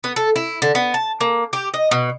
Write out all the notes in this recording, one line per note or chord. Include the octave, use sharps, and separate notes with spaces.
B3
A4
E4
D3
B3
A5
A#3
G4
D#5
B2